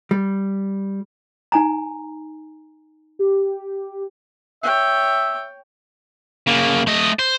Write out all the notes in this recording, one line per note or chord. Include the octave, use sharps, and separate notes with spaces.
G3
D#4 G#5 A#5
G4
C#5 E5 G5
C#3 A#3
A3 D#5
C5